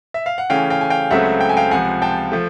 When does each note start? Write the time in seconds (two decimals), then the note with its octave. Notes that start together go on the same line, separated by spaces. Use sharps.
0.14 E5
0.26 F5
0.38 F#5
0.50 C#3 E3 A3 C#4 F5 G5
0.70 F5 G5
0.81 G#5
0.90 F5 G5
1.11 C#2 C#3 F#3 A3 C4 E5 F#5
1.41 G5
1.49 G#5
1.57 F5 G5
1.71 C#2 C3 F3 F#5 G#5
2.02 G5 A5
2.32 F3 A3